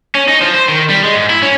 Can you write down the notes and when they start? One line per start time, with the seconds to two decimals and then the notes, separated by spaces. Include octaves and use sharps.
0.15 C#4
0.28 D#4
0.42 F3
0.54 C5
0.69 D#3
0.90 G3
1.04 G#3
1.15 G#2
1.30 E4
1.42 C#4